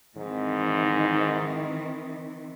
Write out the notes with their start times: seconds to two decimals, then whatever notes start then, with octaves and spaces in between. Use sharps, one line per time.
0.17 G#2 D#3 E3 C4